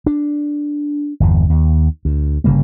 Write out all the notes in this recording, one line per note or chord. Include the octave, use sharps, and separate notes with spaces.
D4
G1 E2
D#2
D2
G1 C#3 G3 A#3